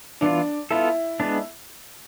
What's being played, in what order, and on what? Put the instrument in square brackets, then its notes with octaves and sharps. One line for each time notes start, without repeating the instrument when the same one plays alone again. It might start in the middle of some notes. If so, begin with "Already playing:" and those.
[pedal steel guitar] E3 B3 F4 [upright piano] D4
[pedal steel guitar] B3 F4 A4 [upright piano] E4
[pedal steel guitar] G#3 B3 D4